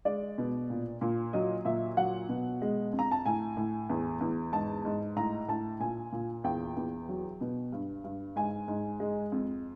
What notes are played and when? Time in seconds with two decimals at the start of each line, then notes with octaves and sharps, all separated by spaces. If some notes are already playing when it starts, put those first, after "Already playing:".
0.05 G#3 D5
0.38 B2
0.70 A#2
1.01 A#2
1.33 F#3 D#5
1.65 A#2 E5
1.97 F#3 F#5
2.29 B2
2.62 G#3
2.93 F2
2.99 A#5
3.11 A5
3.26 A2 G#5
3.57 A2
3.89 E2
4.21 E2
4.52 G#2 A5
4.85 G#2
5.16 A2 A#5
5.48 A2 A5
5.80 A#2 G#5
6.12 A#2
6.44 E2 G5
6.77 E2
7.09 F#3
7.41 B2
7.72 G2
8.04 G2
8.36 G#2 G#5
8.68 G#2
9.00 G#3
9.32 F2